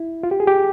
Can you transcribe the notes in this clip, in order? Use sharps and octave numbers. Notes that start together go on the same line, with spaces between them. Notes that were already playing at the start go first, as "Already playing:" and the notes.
Already playing: E4
F4
G4
G#4
G4